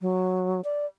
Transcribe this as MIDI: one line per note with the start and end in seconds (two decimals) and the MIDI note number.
0.01 0.61 54
0.64 0.86 74